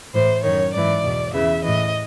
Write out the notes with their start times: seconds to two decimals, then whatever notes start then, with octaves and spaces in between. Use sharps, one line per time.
0.13 A2 E3 C5
0.43 F#2 D#3 C#5
0.73 G#2 E3 D5
1.03 E2 B2
1.33 E2 C#3 E3 E5
1.63 A2 E3 D#5